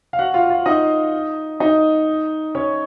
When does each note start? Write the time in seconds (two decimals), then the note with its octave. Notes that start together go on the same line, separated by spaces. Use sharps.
0.13 F5
0.19 F#4 F#5
0.34 F4 F5
0.49 F4 F5
0.66 D#4 D#5
1.60 D#4 D#5
2.55 C#4 C#5